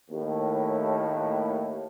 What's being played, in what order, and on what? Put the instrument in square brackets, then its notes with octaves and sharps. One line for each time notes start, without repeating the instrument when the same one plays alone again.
[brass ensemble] D#2 A2